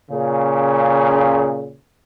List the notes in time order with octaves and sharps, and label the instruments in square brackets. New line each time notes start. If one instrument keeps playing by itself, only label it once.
[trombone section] A#2 C#3